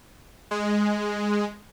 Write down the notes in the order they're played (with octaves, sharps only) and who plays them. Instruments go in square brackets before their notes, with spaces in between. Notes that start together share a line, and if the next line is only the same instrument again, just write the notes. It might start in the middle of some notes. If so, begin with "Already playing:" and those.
[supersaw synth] G#3